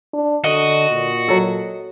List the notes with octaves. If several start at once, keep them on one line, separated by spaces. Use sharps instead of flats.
D4
D3 F#4 D#5
A#2
F#3 A4